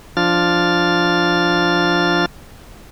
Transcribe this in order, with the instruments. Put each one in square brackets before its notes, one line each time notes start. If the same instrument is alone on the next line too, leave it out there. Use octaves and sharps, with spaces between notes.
[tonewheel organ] F3 D4 F4 F6 A6